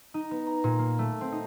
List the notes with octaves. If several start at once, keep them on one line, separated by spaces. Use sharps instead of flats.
D#4
B3
A#5
A#2
A#3
A3
C4
D#4